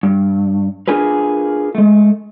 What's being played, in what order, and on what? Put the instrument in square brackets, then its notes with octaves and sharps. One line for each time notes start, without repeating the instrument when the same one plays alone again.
[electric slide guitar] G2
D4 F4 G#4 A#4 B4
G#3 A3